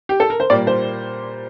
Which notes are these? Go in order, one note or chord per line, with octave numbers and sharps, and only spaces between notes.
G4
A4
A#4
C5
A#2 G3 A#3 D5
C5